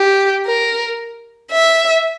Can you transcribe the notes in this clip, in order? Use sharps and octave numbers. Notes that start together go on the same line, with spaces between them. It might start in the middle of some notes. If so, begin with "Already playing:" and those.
Already playing: G4
A#4
E5